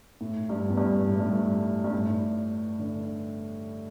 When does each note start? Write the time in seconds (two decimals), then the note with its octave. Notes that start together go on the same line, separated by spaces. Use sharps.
0.21 A2
0.49 G2
0.69 E2
0.77 G2
1.07 A2
1.20 G2
1.32 A2
1.84 G2
1.93 A2
2.79 D3